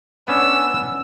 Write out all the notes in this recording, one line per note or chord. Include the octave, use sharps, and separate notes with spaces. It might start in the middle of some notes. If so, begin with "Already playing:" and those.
B3 C#4 D4 E6